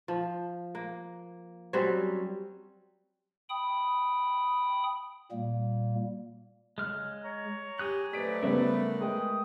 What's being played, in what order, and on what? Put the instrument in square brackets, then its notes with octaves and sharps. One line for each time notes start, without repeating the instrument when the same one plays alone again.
[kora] F3
A#3
F#3 G3 C4 C#4
[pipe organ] G5 B5 D#6
A#2 G3 A#3
[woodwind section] C#3 F#3 [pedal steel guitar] G#3 F6 F#6
[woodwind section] C#5 A#5
[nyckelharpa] G4 [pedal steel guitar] G#4 D#6 F#6
[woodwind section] G#2 F#3 D5 [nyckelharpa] A3 B4 [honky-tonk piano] B6 D7
[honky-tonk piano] C#3 G3 B3 [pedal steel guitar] A#4 E5
[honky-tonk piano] G#3 [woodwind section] G5 D#6